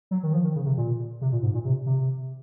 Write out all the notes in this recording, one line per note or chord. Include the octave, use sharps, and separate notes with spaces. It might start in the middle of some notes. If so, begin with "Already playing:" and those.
F#3
D#3
F3
D#3
C#3
C3
A#2
C3
A#2
G#2
A#2
C3
C3